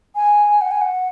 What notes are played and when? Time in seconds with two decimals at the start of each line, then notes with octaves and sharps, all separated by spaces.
0.15 G#5
0.61 F#5
0.71 G#5
0.81 F#5